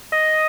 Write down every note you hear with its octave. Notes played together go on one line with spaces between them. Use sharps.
D#5